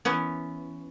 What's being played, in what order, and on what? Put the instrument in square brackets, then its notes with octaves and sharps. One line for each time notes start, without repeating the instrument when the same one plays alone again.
[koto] E3 B3 C#4